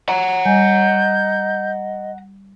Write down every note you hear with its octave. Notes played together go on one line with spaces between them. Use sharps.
F#5 A#5
G3 D#5 G#5 G6